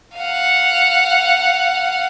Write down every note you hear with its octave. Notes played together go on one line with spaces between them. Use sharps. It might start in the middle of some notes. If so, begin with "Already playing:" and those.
F5 F#5